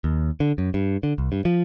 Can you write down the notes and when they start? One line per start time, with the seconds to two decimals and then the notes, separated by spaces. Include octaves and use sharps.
0.04 D#2
0.40 D3
0.58 F#2
0.74 G2
1.03 D3
1.18 C2
1.32 G2
1.45 F3